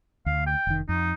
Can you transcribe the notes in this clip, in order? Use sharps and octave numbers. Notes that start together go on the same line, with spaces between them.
D2 F5
G5
F1 D#3
F2 D#4